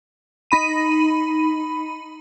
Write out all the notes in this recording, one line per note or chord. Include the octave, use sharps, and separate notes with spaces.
D#4 B5 D#7